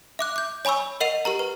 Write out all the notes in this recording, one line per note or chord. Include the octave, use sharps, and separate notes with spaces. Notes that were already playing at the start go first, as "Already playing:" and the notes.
E5 D6 F#6
D6 G6
C#5 G#5 B5 C#6 E6
A#4 D#5 F#5 C7 D#7 F7
G4 A#4 A#5
B4